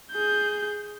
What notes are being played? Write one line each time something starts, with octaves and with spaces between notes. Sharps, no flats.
G#4 G6